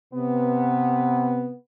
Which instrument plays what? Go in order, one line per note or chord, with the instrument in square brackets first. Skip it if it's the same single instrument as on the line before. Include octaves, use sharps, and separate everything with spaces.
[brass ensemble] C3 B3